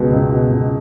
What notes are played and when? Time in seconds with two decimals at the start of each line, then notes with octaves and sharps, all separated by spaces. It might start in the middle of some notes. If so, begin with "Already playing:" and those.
Already playing: C#2 B2 G#3 B3
0.12 C#2
0.31 B2
0.50 C#2